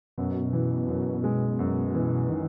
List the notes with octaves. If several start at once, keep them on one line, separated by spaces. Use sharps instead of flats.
F#2 B2
E3
F#2
G#3
F#2
E3
D#3